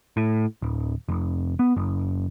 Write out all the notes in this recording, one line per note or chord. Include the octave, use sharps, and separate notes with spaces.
A2
D1
F1
B3
F#1